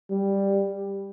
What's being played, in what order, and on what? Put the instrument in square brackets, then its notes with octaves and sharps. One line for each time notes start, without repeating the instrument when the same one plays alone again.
[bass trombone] G3